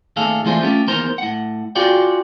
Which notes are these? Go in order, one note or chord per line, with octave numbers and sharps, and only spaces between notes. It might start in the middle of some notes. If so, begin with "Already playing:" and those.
D#2 A#2 A3 G#4 A4 F5
E3 G3 A3 F4 G#4 C5
A3 C#4 F4 G4
E2 D#3 A#3 A#4 C5 A#5
A2 F#5
F4 F#4 G#4 D5 F5 G5